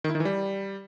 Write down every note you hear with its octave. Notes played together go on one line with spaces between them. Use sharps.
D#3
E4
D#3
E3
G3